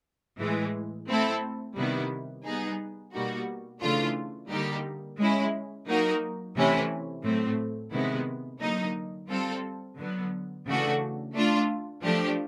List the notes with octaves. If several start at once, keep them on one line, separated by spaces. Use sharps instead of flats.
A2 E3 G#3
A3 C4 E4 A4
C3 D#3 G3 B3 E4
G3 B3 D#4 G#4
B2 G3 A#3 D#4 F#4
C#3 E3 A3 D4 F4
D3 G3 A#3 D#4 G4
G#3 C#4 E4
F#3 A#3 D#4 F#4 A#4
C3 E3 A3 C#4 E4
A2 F#3 A3 C4
C3 D#3 G#3 B3 E4
D3 F#3 A#3 D#4
G3 C4 F4 A4
D3 F#3 B3
C#3 E3 A3 D4 F#4
A3 D4 F4
F3 A3 D4 G4